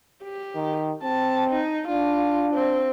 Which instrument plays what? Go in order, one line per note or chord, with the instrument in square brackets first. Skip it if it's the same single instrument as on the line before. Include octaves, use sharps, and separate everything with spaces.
[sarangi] G4
[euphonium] D#3
[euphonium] C4 [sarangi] A5
[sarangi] D#4
[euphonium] D4 [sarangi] F4
[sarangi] C4